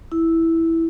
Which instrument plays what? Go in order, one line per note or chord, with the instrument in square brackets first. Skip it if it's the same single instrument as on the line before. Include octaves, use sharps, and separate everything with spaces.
[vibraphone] E4